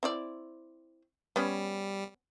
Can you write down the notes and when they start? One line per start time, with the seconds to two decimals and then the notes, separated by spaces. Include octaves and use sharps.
0.03 C4 E4 D5
1.36 G3 B3 C#4